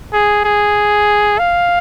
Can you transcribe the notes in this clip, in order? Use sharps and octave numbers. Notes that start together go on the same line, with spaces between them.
G#4
G#4
F5